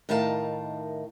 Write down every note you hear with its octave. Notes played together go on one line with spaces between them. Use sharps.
A2 D#3 D#4 A#4 F5 A5